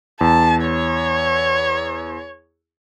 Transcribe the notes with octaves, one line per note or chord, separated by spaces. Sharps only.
E2 A5
C#5